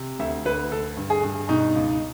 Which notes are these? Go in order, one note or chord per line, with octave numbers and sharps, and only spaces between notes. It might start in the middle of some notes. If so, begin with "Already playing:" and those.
Already playing: C3
D2 E5
D2 B4
D3 A4
G2
G#4
G2
B2 D#4
C#2